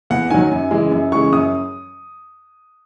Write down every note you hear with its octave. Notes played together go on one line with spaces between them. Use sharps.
E2 F#5
D#3 F#3 G#5
F#2
C#3 E3 G#3
F#2
C#3 E3 G#3 C#6
F#2 D#6